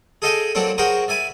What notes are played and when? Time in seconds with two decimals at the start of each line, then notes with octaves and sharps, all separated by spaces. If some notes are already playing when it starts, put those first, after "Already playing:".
0.22 G#4 A4 D#5 F5 G5 G#5
0.55 F#3 A#3 C4 D4 A4
0.78 F#4 G#4 A#4 C5 G5
1.08 D5 E5 G#5 B5